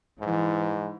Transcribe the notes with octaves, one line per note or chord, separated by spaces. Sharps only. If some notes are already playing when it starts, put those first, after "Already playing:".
G#2 E3